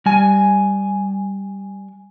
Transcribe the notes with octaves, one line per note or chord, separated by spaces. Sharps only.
G3 G#5